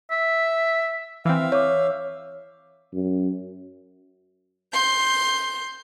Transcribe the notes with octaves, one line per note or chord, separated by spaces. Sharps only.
E5
E3 C4 E5 F5
C#5 D6
F#2
C6 G6